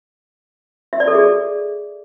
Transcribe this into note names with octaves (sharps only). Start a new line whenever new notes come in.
E5
D5
A4
G#4